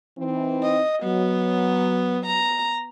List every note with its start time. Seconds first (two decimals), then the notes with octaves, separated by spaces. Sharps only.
0.18 E3 C4 D#4
0.63 D#5
1.03 F#3 B3
2.27 A#5